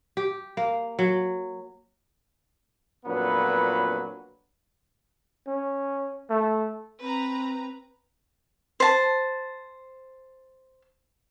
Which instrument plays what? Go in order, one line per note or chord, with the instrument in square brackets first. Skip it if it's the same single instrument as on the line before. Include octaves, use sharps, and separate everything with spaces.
[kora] G4
A#3
F#3
[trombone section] F2 A#2 F#3 B3 D4 B4
[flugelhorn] C#4
A3
[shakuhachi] C4 [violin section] B4 A#5
[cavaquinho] C5 A5